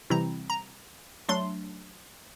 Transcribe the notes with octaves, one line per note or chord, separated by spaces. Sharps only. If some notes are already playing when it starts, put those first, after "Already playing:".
C3 E3 G3 C4 E4 A#5
A#5
F#3 A3 D4 C6